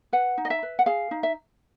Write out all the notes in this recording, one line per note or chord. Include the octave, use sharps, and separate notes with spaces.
B4 F#5
D#4
D#5
E5
B4
F#5
G#4 F5
D#4
E5